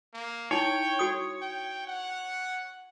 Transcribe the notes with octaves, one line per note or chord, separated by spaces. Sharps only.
A#3
D#4 E4 C#5 G5
F#4 D#6
G5
F#5